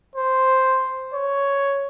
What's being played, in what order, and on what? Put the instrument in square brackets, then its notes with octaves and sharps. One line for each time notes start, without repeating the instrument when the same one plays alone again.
[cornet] C5
C#5